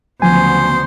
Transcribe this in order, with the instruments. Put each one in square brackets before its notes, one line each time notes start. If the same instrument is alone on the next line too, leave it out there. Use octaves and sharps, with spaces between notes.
[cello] D2 B3 [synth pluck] C#3 F3 F#3 [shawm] C5 [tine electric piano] G#5